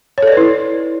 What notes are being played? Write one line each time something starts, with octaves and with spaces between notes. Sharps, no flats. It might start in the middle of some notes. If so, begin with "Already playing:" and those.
E4 A4 B4 C#5 D5